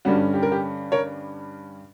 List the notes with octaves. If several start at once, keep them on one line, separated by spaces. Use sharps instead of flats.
G2 D3 G3 C#4 F#4
G4
A#4
G4
A#4 C#5